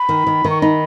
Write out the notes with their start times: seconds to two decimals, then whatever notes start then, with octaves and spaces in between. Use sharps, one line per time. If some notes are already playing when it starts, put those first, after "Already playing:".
Already playing: B5
0.09 D#3
0.27 D#3
0.44 D#3
0.50 C#6
0.62 D#4 B5